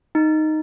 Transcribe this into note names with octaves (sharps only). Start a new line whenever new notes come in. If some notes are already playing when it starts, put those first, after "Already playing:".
D#4